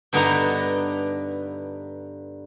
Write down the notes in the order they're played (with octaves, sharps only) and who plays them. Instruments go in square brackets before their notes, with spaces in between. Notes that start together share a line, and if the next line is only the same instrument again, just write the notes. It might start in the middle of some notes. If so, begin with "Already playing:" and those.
[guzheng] G2 D3 B3 D#4 B4 A#5